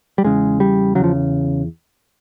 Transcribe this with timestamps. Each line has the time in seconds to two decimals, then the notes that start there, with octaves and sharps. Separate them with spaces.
0.18 G3
0.24 E2 C#3 G#3
0.60 G3
0.95 C#3 F#3
0.99 E2 F3